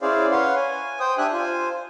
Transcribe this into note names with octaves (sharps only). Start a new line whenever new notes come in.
C#4 E4 G#4 C5 D5 F5
B4 C#5 F5 F#5 C6
G#5
C5 G5 D#6
D4 G4 E5 G#5 F#6
F4 C5 G#5